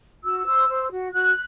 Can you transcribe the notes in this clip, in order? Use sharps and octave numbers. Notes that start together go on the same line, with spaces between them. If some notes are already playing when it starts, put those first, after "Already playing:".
F#4 E6
C5
C5
F#4
F#4 F#6